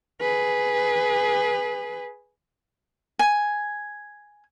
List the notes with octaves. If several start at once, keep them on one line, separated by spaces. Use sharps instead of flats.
G#4 B4
G#5